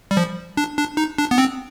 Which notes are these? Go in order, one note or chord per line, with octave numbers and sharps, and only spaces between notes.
G3
F3
D4
D4
D#4
D4
B3
C4